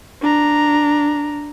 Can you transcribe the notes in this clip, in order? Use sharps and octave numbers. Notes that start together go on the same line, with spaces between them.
D4 A#5